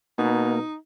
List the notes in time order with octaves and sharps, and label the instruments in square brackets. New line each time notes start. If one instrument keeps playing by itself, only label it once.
[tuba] B2 [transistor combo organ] A#3 [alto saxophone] D#4